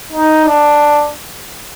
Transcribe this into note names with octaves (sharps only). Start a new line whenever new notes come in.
D#4
D4